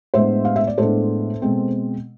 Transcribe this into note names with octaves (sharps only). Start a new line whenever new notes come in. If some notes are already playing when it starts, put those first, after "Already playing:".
A2 G#3 B3 D4 C5 E5
F5
E5
D5
A2 G#3 B3 D4 A4 C5
B2 G#3 C4